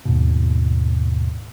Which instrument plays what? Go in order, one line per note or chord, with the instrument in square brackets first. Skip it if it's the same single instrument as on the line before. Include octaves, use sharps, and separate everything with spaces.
[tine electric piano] D#2 G#2 B2